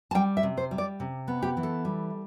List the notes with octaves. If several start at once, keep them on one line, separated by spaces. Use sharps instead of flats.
A5
G3 G5
E5
C3
C5
G3
D5
C3
B3
G4
E3
A4
G3